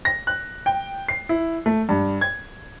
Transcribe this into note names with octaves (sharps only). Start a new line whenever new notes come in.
A#6
F#6
G5
C7
E4
A3
G2
G#6